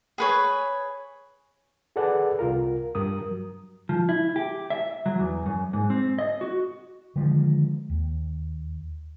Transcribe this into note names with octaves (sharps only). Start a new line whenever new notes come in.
G#4 B4 C#5
G#4 A4 B4 D5 F#5
C2 F4 A#4
G2 A#4 D#6
F#3
F3
E4
G4
E5
F#3
E2
F#2
G#2
C4
D#5
F#4
D3 D#3 F3 G#3
D#2